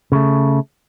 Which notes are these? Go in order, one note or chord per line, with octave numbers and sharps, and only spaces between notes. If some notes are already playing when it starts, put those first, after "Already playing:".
C#3 A3